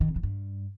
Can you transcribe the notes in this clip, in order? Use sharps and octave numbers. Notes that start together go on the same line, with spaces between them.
D#3
C3
E3
G2